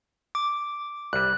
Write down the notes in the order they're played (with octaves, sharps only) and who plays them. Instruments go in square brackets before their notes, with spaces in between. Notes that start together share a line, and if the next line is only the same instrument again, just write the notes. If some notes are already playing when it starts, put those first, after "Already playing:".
[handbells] D6
[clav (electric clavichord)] C2 G3 [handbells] F#6